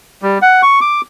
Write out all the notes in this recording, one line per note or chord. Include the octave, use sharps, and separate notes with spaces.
G3
F#5
C#6
D6